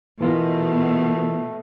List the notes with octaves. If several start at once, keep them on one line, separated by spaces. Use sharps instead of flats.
B2 E3 A3 F4 A#4